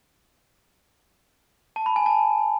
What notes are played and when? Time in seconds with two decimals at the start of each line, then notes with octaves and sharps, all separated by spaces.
1.76 A5
1.86 B5
1.96 G#5
2.06 A5